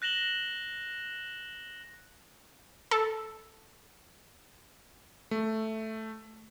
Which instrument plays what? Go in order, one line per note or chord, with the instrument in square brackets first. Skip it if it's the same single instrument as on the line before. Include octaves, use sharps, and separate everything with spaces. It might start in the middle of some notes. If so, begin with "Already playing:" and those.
[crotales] F#6 A#6 E7 F#7 G7
[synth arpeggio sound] A4
[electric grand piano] A3